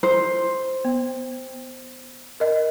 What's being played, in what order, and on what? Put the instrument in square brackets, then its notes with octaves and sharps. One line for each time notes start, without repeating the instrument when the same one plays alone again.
[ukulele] C5
[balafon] B3
A#4 D#5